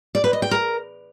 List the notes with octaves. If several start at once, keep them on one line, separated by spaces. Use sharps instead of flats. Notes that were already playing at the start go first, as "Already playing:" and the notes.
D5
B4
D#5
G5
A#4